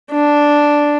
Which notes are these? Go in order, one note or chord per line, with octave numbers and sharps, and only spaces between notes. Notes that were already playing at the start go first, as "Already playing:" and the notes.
D4